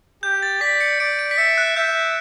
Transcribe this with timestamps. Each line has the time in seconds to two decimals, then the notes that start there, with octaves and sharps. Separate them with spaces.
0.23 G4 G6
0.43 A6
0.61 D5 B6
0.80 C#7
1.00 D5 D7
1.19 D7
1.31 B6
1.38 E5 C#7
1.57 F#6
1.76 E5 G6